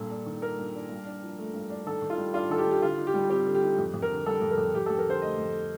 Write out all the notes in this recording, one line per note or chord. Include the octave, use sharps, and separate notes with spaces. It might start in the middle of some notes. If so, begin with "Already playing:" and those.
Already playing: G2 A#2 A4
D4
D#3
A#3 A#4
G2
D4
G2
D4
F3
A3
G2
D4
D#3 A4
D#3
F4
G3
D4 F4
D#3 A4
G4
D#3
G4
D3 F4
D#4
G4
G3
C4 G4
D3
G4
D#4
F2
F2
A#4
D3
G3 A4
F2
A#4
F2
F2 G4
A4
F2
A#4
D3 C5
A3 D#5
F2